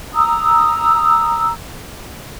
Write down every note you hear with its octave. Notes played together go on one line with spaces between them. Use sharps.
A#5 D#6 E6